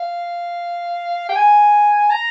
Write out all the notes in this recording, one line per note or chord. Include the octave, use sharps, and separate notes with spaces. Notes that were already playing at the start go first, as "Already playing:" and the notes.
Already playing: F5
G5
G#5
A#5